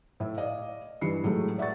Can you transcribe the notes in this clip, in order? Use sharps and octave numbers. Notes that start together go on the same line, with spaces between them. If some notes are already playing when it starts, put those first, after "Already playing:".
A2 E5
D5 D#5 F5
G2 E3 C7 C#7
A2 F#3 G#3 A3
D5 E5 F#5 C#6 A6